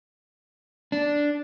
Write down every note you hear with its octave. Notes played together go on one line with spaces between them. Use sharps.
D4